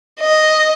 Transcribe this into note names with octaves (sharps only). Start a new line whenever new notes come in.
D#5